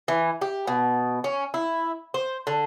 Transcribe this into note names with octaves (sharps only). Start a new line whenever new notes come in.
E3
G4
B2
C#4
E4
C5
D3